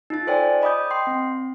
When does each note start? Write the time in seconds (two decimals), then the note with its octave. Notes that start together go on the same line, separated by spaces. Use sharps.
0.10 D#4 F4 A6
0.27 A4 C5 D5 G5 G#5
0.62 D#5 B5 D6 D#6 G6
0.91 G5 C6 C7
1.07 C4